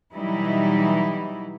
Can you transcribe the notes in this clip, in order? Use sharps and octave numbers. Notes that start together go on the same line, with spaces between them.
B2 E3 F#3 G3 D#4 E4